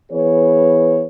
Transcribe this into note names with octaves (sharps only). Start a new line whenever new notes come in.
E3 B3 G#4 B4 C#5